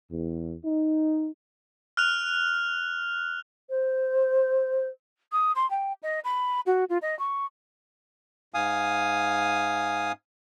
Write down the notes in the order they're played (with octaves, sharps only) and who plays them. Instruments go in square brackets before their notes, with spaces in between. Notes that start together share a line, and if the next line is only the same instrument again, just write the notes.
[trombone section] E2
D#4
[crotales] F6 F#6 F7
[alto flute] C5
[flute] D#6
C6
G5
D#5
B5
F#4
F4
D#5
C#6
[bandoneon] G#2 F5 G#5 D#6